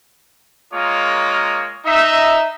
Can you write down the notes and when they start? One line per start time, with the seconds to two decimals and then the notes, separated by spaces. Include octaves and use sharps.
0.72 G#3 A#3 F4 A#4 C#5 D#6
1.86 D#4 E5